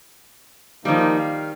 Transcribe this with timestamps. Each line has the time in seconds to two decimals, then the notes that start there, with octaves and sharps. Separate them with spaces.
0.85 D#3 F3 G3 A#3 D#4
1.17 F5